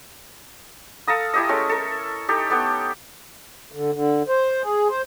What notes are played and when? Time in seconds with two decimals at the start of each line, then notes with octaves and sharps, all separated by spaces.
1.08 A4 F5 A#5 D#6
1.34 E4 G4 D#5
1.49 G#3 A3 C#4
1.69 A4 A#4
2.28 D#4 G4 A4
2.50 A3 B3 G4
3.72 D3
3.92 D3
4.28 C5
4.63 G#4
4.89 C5